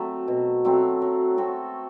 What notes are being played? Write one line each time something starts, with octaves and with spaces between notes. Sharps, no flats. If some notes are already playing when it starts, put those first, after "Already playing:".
Already playing: F#3 A3 C4
B2
F#3 A3 C4
F#3
C4 F#4 A4